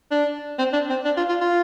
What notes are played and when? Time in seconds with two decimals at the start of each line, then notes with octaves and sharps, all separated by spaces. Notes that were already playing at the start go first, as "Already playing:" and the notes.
0.11 D4
0.59 C4
0.73 D4
0.90 C4
1.05 D4
1.17 F4
1.29 F4
1.41 F4